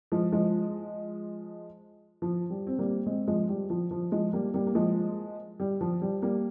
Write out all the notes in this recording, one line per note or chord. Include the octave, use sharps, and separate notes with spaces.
F3 G#3
F3 G#3
F3
G3
C4
G3 A#3
G#3 C4
F3 G#3
G3
F3
F3
F3 G#3
G3 A#3
G3 A#3
A#3
F3 G#3
G3
F3
G3
G3 A#3